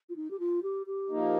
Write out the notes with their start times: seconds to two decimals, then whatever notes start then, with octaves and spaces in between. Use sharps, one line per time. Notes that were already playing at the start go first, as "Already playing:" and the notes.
0.09 F4
0.16 D#4
0.31 G4
0.39 F4
0.63 G4
0.86 G4
1.10 F3 A#3 D#4